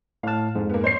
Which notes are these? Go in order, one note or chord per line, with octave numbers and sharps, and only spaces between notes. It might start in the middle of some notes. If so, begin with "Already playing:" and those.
A2 F5 A5 F6
F2 G#2
A#3 B3
C5 C#5 C7